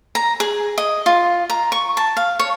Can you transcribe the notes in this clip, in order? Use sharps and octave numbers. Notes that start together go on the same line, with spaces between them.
A#5
G#4
D#5
F4
A#5
C#6
A5
F5
C#5